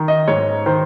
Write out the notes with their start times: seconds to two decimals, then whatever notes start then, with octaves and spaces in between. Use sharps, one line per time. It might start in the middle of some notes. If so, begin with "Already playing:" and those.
Already playing: D#3
0.08 D#5
0.28 G#2 C#5
0.66 D#3 C5